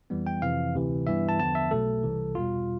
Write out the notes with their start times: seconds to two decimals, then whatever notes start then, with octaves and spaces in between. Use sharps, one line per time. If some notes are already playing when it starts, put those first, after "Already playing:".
0.10 F2 E3 G3 B3
0.27 G5
0.42 F2 C3 E3 F5
0.74 D2 C3 E3
1.07 G2 E3 G3 B3 E5
1.29 A5
1.39 E2 D3 F3 B3 A5
1.55 E5
1.71 B1 B2 A3 A4
2.03 C2 C3 E3
2.35 E2 B2 G3 F4